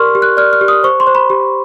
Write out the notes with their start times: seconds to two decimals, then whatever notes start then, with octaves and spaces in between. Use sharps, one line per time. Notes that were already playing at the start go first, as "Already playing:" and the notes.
Already playing: G4 A#4 D5 C6 C#6 F6
0.15 G4
0.22 F#6
0.37 D5 F6
0.53 F6
0.61 G4
0.68 D#6
0.83 C5 C#6
1.00 C6
1.07 C5
1.15 B5
1.30 G4